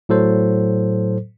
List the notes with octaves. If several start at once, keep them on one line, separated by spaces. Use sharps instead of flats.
A2 F#3 A4 C5